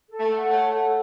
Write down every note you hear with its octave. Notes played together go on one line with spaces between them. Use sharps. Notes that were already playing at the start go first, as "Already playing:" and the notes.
A4
A3
F#5
A3 C#5
A4